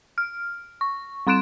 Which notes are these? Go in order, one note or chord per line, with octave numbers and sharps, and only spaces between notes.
F6
C#6
G3 C4 C6 F#6 D7 E7